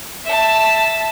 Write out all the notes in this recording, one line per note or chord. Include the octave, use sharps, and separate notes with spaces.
E5 A5